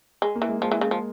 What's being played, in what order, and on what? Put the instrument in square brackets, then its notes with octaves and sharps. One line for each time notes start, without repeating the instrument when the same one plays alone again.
[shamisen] G#3
[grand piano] A#3
[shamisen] E3
[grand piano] G#3
[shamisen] F3 [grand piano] G#3
[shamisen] E3
C#3
F3